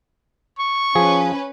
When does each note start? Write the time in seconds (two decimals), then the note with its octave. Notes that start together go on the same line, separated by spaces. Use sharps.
0.59 C#6
0.95 F3 C#4 G#4 B4